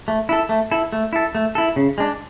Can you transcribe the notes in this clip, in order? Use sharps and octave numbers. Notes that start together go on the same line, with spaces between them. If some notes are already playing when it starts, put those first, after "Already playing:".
A3
E4 A4
A3
E4 A4
A3
E4 A4
A3
E4 A4
C#3
G#3 D4